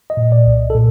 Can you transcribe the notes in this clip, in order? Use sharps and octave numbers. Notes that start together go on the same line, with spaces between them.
D#5
A#2
D5
C2
A4
A#2